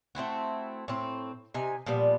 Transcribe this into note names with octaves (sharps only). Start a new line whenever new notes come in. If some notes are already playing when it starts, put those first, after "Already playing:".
A3 C4 E4 F#4
A2 C4
C3 D#4 G#5
A#2 F3 G3 B3